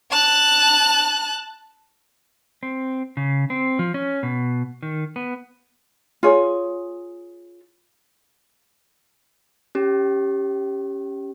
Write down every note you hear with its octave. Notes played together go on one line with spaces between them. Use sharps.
A5 F#6
C4
C#3
C4
F3
C#4
B2
D#3
B3
F4 G#4 C#5
C#4 G4